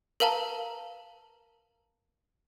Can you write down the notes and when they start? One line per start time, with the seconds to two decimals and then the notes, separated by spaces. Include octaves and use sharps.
0.20 A#4 B4 F5 A5 A#5